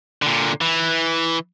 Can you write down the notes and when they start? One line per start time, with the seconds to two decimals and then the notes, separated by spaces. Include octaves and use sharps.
0.22 A#2 D3
0.61 E3